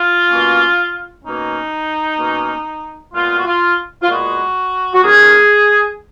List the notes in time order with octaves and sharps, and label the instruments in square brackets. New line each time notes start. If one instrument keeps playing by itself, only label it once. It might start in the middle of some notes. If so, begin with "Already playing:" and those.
Already playing: [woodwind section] F4
B2 A#3 C#4
B2 A#3 C#4 D#4
B2 A#3 C#4
A#2 G#3 B3 F4
F#4
F4
F4
A#2 G#3 B3 F#4
F#4
D#2 D#3 A#3 C#4 G#4